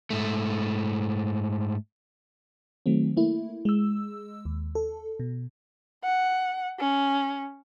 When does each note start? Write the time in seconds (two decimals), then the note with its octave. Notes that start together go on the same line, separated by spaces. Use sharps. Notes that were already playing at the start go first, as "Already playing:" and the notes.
0.10 G#2 A3
2.86 D#3 F#3 A3 C4
3.17 A3 A#3 E4
3.65 G#3 E6
4.45 D#2
4.75 A4
5.20 B2
6.04 F#5
6.79 C#4